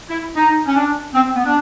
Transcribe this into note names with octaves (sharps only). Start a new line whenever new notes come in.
E4
D#4
C#4
D4
C4
B3
D4